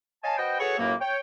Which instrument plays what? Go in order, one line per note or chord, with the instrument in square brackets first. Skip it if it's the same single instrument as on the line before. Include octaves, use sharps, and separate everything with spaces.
[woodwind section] C#5 D#5 F5 G#5 A5
F#4 B4 C5 D#5 G5
F#4 G#4 A4 B4 C#5
C#2 F#2 A2 F#3 A#3
C#5 G5